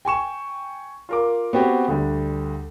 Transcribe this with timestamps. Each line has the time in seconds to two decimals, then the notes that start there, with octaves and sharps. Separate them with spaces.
0.05 G5 G#5 C#6 E7
1.09 F4 A#4 D6
1.53 B3 C4 F#4 G4
1.88 D2 D3 G3